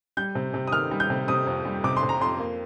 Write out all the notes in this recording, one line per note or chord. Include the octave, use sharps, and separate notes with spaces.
G3 G6
C3
C3
D#6
D#3 F6
G3
G6
C3
C3 D#6
F2
G3
C3 D6
C6
C3
A#5
F2 C6
A#3